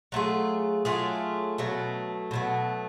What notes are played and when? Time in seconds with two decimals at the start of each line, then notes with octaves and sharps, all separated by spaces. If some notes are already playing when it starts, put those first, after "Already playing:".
0.12 F#3 A3 F4 G#4
0.85 F#3 A3 F4 G#4
1.58 B2 F#3 A3
2.31 B2 F#3 A3